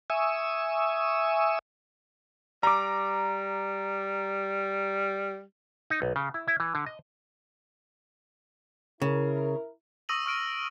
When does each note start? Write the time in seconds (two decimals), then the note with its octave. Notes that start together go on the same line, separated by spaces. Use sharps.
0.10 E5 G#5 C#6 D#6 E6
2.63 G3 A#5 D6
5.90 D#4
6.02 B1
6.16 C#3
6.34 E4
6.48 E4
6.60 E3
6.75 D3
6.86 D#5
9.02 C#3 E4 A#4
10.09 C#6 D#6 E6 A#6 D#7 F#7
10.26 C#6 F6 D7 D#7